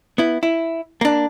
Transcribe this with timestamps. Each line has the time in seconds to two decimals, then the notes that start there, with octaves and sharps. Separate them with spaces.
0.18 B3 E4
0.43 E4
1.01 A#3 D4